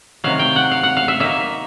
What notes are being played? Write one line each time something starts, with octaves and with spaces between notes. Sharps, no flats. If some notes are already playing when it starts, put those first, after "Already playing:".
C3 D#3 F#3 F5
G5
F#5
F5
F#5
F5
E5
F#3 A#3 D#4 E5